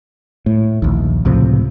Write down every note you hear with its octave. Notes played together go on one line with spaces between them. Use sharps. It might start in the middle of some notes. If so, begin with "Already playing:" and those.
A2
A#1 D#2
C#2 A2 C3 F3